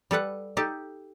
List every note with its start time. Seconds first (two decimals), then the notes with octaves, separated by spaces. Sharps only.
0.11 G3 A4 B4 F#5
0.57 D#4 G4 A4 A5